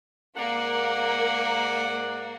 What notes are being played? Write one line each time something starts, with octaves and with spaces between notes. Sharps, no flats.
G#2 A#3 D5 F#5